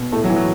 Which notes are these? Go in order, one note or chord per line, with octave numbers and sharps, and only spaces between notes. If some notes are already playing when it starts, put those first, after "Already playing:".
Already playing: B2
A2 A3
F#3
E3
F#3